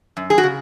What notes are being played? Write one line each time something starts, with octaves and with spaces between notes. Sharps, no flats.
F#2
G#4
F#4
C#3